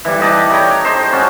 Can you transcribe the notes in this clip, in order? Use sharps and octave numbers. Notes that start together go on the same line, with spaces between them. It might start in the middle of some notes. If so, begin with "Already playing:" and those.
E3 G3
G4 D5 D#5 A5
C#5 G5 A#5
C5 D#5
C#4 F#4 A5